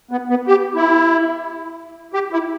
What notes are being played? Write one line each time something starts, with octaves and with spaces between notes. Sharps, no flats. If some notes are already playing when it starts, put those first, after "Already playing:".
B3
B3
G4
E4
G4
E4